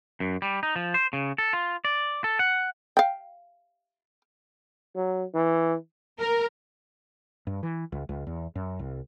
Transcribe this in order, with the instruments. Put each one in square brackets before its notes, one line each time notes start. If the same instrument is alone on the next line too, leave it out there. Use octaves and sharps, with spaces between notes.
[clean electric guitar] F#2
G3
D#4
F3
C5
C#3
A4
F4
D5
A4
F#5
[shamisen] F5 G5
[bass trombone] F#3
E3
[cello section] A#4
[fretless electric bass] G2
E3
C#2
C#2
E2
F#2
C2